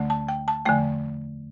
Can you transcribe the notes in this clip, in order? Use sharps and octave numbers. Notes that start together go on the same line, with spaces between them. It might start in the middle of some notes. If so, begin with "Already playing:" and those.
Already playing: D2 D3 A3
A5
G5
A5
E2 D3 F3 A3 G5